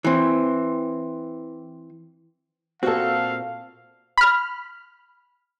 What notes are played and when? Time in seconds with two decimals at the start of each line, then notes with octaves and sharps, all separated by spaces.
0.04 E3 C4
2.83 A#2 C4 F#4 A4 F5
4.18 B5 F6